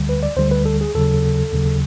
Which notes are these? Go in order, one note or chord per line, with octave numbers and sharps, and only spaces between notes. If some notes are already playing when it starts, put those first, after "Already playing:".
Already playing: D2 D3 G3
B4
D5
D2 D3 G3 C5
B4
A4
G#4
D#2 C#3 F#3 A4
D#2 C#3 F#3